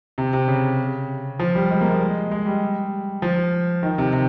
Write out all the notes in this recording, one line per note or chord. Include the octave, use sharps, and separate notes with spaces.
C3
C3
C#3
F3
G3
G#3
A#3
G#3
G#3
G3
F3
D#3
C3
C3